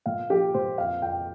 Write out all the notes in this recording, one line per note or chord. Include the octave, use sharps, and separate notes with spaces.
A#2 F5
F3 G4
A#2 C5
F2 F5
F2 G5